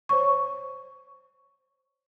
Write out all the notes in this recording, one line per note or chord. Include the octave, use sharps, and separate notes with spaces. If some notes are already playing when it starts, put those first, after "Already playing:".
C5 C#5 C#6